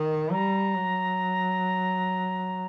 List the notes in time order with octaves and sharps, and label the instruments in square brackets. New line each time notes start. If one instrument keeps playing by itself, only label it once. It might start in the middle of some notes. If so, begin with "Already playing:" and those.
Already playing: [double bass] D#3
[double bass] G3 [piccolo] A#5
[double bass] F#3